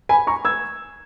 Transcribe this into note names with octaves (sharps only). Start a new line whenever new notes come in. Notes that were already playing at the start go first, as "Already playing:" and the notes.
G#5 B5
A#5 C#6
E6 G#6